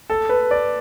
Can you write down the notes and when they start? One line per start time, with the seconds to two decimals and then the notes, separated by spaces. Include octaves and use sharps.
0.10 A4
0.29 B4
0.51 D5